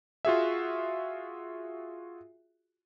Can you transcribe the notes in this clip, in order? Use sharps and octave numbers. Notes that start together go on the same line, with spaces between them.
F4 F#4 G#4 E5